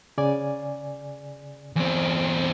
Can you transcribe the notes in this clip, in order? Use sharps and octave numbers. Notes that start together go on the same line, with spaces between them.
C#3 D5 G#5
E2 C4